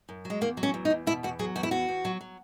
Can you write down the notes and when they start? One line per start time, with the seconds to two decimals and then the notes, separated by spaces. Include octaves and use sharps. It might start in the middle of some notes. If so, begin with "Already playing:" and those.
0.09 F#2
0.25 F#3
0.30 G#3
0.41 E2 A#3
0.57 F#3
0.63 C#4
0.74 E2
0.85 D#4
0.90 E2
1.07 B2 E4
1.23 E2 F#4
1.39 F#3 G#4
1.56 E2 F#4
1.63 E4
1.71 E2 F#4
1.89 E2
2.05 F#3
2.21 F#3